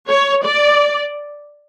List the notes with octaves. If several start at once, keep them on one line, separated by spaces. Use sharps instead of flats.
C#5
D5